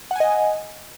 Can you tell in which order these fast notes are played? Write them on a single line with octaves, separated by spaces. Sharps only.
F#5 G#5 D#5